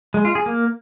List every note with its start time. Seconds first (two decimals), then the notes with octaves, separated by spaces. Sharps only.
0.14 G#3
0.25 F4
0.35 G#4
0.46 A#3